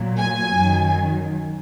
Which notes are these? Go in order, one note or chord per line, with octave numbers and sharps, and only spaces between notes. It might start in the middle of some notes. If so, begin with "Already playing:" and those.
Already playing: A#2 F#3
G#5
F#2 D#3 F#3